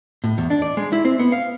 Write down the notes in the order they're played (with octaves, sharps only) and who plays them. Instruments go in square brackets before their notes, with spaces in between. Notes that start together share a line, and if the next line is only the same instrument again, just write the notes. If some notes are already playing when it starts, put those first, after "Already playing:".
[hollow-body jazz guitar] A2
E2
D4
D5
G#3
E4
C4
B3
F5